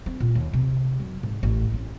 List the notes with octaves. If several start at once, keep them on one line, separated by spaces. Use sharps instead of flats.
C4
A#2
D#2
C3
F#2
G#2
A1
C#4